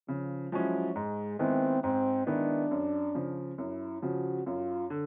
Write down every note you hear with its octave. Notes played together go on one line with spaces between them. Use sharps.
C#3 F3
F3 F#3 G#3 C#4 E4
G#2 G#3
D#3 G#3 B3 C4 E4
G#2 C4
D#3 G#3 B3 D4 E4
F#2
C#3 F3
F#2 E4
C#3 F3 F#4
F#2 F4
D3